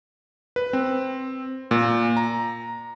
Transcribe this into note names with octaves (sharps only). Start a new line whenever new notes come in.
B4
C4
A#2
A#5